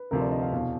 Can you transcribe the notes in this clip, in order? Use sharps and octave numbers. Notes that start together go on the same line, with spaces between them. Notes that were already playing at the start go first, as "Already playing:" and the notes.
Already playing: B4
D2 C3 F3 A#4
D5
D#5
F5
E2 B2 F5